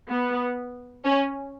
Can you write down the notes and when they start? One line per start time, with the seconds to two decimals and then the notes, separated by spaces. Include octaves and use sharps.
0.09 B3
1.04 C#4